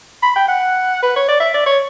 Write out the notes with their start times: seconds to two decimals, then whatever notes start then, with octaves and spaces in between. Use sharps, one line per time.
0.23 B5
0.36 G5
0.48 F#5
1.03 B4
1.16 C#5
1.28 D5
1.40 E5
1.54 D5
1.66 C#5